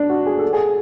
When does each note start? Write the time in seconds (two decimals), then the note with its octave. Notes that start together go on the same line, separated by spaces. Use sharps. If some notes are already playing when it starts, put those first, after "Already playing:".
Already playing: D4
0.09 F#4
0.26 G#4
0.39 A4
0.53 G#4